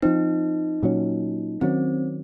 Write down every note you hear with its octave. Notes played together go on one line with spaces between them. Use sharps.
F3 C4 D#4
A#2 F#3 C#4
D#3 F#3 C4 C#4